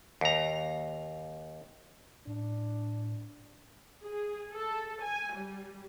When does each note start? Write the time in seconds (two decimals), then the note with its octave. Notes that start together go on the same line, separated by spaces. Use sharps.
0.21 D#2 A#5
2.27 A2 D4
4.05 G#4
4.54 A4
5.02 G#5
5.33 G3